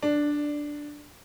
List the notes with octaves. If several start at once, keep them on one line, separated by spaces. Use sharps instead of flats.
D4